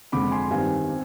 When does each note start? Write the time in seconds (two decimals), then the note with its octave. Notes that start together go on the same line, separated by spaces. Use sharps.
0.12 F2 D3 G#3 B5 D6
0.31 G#5 C6
0.51 G2 D#3 G3 C4 F5 G#5
0.88 C4